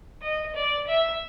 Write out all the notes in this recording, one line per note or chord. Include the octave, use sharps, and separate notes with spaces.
D#5
D5
E5